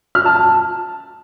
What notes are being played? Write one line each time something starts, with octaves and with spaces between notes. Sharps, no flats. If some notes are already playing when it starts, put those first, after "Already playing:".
F6
A5
A5